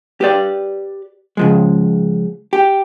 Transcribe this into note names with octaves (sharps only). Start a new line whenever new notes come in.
G4 B4 D5
C#3 F3 G#3
G4